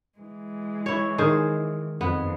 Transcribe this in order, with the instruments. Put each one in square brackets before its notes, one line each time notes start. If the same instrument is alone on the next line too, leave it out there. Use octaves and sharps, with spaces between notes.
[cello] E3 G#3
[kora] E4 C#5
D#3 G#4 C5
[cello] F2 [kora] B3